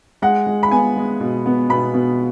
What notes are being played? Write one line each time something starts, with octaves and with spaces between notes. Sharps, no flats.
G#3 F#5
G#3
B5
B3 G#5
G#3
B2
B3
B2 B5
B2